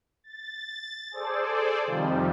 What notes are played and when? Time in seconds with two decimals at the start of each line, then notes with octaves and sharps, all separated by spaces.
0.24 A6
1.12 G#4 A4 C5 D5
1.86 F2 C3 D#3 F3 G3